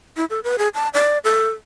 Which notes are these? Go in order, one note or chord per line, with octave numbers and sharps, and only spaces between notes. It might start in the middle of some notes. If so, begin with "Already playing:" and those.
E4
A4
B4
G#4
A5
D5
A4